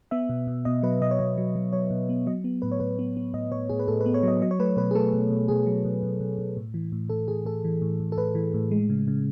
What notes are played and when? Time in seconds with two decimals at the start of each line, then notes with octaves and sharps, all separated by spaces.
0.11 B3 E5
0.29 B2
0.47 B2
0.65 B2 D#5
0.83 F#3 B4
1.01 B2 D#5
1.11 C#5
1.19 B2 D#5
1.37 F#3
1.55 F#3
1.73 F#3 C#5
1.90 B2
2.09 B3
2.26 F#3 D#5
2.44 B3
2.62 A2 B4
2.72 C#5
2.80 A2 B4
2.99 B3
3.17 B3
3.34 A2 D#5
3.52 A2 C#5
3.69 A2 G#4
3.79 B4
3.88 A2 A4
4.01 B4
4.06 B3
4.14 C#5
4.23 F#3 D#5
4.42 F#3 D#5
4.51 C#5
4.59 A3 B4
4.77 B2 B4
4.91 G#4
4.95 A3 A4
5.14 B2
5.30 B2
5.48 B2 G#4
5.66 F#3
5.85 B2
6.03 B2
6.20 B2
6.38 B2
6.57 A2
6.74 E3
6.92 A2
7.09 A2 A4
7.28 A2 G#4
7.45 A2 A4
7.64 E3
7.82 A2
8.00 A2
8.12 A4
8.17 A2 B4
8.35 E3
8.54 A2
8.71 G#3
8.90 C#3
9.08 C#3